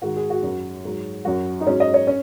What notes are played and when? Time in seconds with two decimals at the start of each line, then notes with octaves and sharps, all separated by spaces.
0.02 G#2 D#3 G#3 F#4
0.16 G#4
0.30 F#4
0.43 F#2 F#3
0.85 G#2 F#3
1.25 F#2 F#3 F#4
1.61 D#4
1.66 G#2 F#3 C#4
1.80 D#5
1.94 C#5
2.07 C#4